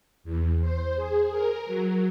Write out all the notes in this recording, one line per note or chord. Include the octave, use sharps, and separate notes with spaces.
E2
C5
G#4
A#4
F#3